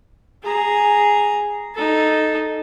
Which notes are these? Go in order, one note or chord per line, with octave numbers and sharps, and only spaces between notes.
G#4 A#5
D#4 A4